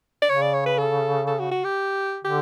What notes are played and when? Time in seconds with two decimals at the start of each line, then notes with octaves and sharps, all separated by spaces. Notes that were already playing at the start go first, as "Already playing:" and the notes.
0.22 D5
0.29 C#3 C#5
0.42 D5
0.54 C#5
0.66 B4
0.78 A4
1.27 A4
1.39 F#4
1.51 F#4
1.64 G4
2.25 D3 G4